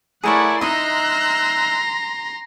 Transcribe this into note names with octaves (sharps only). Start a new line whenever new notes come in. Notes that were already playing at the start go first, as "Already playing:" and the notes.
A3 E4 G#4 A#4 C#5 D5 F#5
D#4 D#5 E5 A#5 C6 E6 F#6 G6